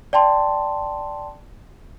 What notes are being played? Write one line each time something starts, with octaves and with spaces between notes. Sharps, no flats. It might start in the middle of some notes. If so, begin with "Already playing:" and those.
D5 G5 A5 C6